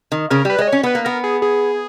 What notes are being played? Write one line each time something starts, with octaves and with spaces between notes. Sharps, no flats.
D#3
C#3 A#4
G3
B4
G#3 D#5
C#4 C#5
B3 B4
A#3
B3 A#4
G#4
G#4